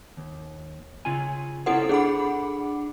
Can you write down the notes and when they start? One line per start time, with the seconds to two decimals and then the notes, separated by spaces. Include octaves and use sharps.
0.17 D#2
1.05 C#3 F4 G#5
1.66 C#4 E4 F4 A4 C5 F#5
1.89 D4 G#4 F#5 B5